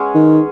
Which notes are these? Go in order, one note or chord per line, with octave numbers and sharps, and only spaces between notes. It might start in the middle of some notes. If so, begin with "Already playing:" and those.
Already playing: G#3 B3 C#4 G#4
D#3